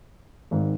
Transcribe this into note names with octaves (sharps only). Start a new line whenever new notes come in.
G#1 G#2 D#3